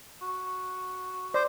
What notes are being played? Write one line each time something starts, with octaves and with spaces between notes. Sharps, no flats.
F#4
C5 D5